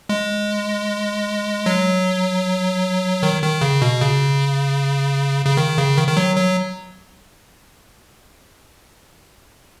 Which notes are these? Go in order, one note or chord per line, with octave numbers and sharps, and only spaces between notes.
G#3
F#3
D#3
D#3
C#3
B2
C#3
C#3
D#3
C#3
D#3
D#3
F#3
F#3